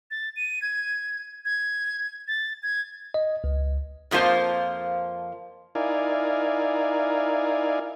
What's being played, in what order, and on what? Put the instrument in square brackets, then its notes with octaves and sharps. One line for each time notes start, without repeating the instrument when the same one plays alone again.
[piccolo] A6
D#7
G#6
G#6
A6
G#6
[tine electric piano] D#5
C#2
[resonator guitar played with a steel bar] F2 F3 A#3 F4 C5
[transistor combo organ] D#4 E4 A#4 D5 F5 G#5